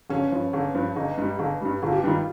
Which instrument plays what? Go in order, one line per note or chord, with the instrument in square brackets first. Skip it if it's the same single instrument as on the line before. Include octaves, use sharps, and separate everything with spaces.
[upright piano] G1 [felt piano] C#4
[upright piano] G2 F3
G1
G2 F3
[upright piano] G1 [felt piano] D#4
[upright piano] G2 G3
G1
G2 G3
[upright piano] G1 [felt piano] F4
[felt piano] G4
[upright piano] G2 D#3 G3 [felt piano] F4